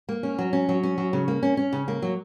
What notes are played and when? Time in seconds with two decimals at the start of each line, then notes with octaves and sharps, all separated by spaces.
0.09 A#3
0.23 C#4
0.39 F#3
0.53 C#4
0.69 F#3
0.83 C#4
0.98 F#3
1.13 C#3
1.28 A#3
1.43 C#4
1.57 C#4
1.73 C#3
1.88 A#3
2.02 F#3